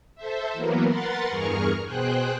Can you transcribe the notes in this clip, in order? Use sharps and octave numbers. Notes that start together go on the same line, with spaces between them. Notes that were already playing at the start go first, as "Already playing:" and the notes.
A4 C5 E5
E3 F#3 A#3 B3 A#4
A#4 B4 F#5 C6 A6
E2 G2 G#4 A#4 C#6 F6
B2 G#4 C5 G5 F#6